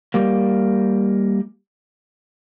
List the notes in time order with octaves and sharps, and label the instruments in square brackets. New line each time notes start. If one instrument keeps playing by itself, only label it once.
[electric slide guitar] G3 A#3